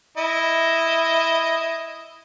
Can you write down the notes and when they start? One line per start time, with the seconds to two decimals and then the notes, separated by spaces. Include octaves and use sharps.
0.18 E4 D#5